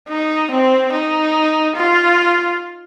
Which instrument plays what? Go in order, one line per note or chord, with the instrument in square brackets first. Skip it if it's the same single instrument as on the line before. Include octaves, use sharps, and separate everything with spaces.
[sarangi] D#4
C4
D#4
F4